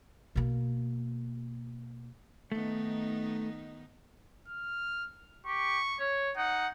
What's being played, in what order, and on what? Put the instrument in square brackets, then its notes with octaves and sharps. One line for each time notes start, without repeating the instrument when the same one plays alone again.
[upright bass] B2 A#3
[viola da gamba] D#3 B3 D#4 [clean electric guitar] A3
[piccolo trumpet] F6
[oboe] G4 [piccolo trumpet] C#6
[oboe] C#5
[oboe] D#4 [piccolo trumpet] F#5